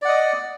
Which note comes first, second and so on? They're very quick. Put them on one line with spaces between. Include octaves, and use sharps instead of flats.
D5 F#5 D#5